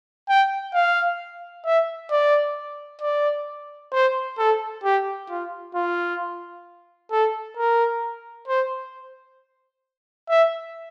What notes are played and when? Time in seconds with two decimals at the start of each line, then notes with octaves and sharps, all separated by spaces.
0.29 G5
0.74 F5
1.65 E5
2.11 D5
3.01 D5
3.93 C5
4.38 A4
4.84 G4
5.30 F4
5.75 F4
7.11 A4
7.57 A#4
8.48 C5
10.29 E5